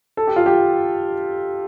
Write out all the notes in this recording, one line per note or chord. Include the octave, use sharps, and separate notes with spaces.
A4
G4
F4
G4